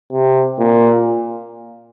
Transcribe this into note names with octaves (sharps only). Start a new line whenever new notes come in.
C3
A#2